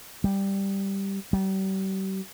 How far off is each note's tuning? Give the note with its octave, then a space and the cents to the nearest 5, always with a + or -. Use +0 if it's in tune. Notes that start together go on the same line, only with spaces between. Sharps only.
G3 +0
G3 -40